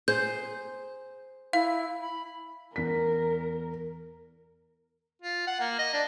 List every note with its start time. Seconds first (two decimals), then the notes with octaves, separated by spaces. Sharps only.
0.08 G#4 C5 G6
1.53 E4 F5
2.01 B5
2.76 E2 A#4 B6
5.22 F4
5.47 F#5
5.60 A#3
5.79 D#5
5.94 D4